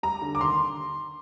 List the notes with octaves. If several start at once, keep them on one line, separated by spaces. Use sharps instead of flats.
G3 A#5
D3
D6
D#2 C6